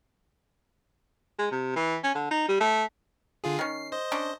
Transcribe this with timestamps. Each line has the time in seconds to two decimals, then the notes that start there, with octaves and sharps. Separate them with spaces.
1.39 G#3
1.51 C3
1.76 E3
2.04 C#4
2.15 D3
2.31 D#4
2.48 G3
2.60 A3
3.44 D3 F4 G#4
3.59 D#3 C#4 C7
3.92 C5 D#5
4.12 C#4 D4